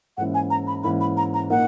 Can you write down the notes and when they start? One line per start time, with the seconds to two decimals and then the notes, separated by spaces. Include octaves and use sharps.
0.17 G#2 E3 A#3 C#4 E4 F#5
0.34 G#5
0.50 A#5
0.67 B5
0.84 G#2 E3 A#3 C#4 E4 B5
1.01 B5
1.17 A#5
1.34 A#5
1.50 A#2 A#3 D#4 A#4 F#5